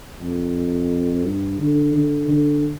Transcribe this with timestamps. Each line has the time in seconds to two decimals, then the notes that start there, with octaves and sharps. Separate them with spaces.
0.21 F2
1.24 G2
1.59 D3
1.94 D3
2.28 D3